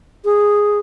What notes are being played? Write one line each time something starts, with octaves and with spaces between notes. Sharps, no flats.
G#4